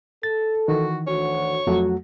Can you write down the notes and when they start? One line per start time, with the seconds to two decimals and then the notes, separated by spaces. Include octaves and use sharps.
0.23 A4 A6
0.68 D#3 E3 F#4
1.07 D2 F#4 C#5
1.67 F2 F#3 A3 F#4